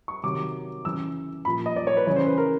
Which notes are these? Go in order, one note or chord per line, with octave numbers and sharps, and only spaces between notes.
C#6
C3 D#3 F#3 D6
C#3 E3 E6
A#2 F3 B5
D#5
D5
C#5
B4
C#3 E3 C#5
C5
B4
A#4